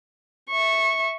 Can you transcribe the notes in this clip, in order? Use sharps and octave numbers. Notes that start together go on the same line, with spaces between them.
E5 C#6